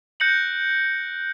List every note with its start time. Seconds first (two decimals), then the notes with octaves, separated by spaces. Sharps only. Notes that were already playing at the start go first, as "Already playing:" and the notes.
0.20 F#6 G6 A#6 C#7 D7 F#7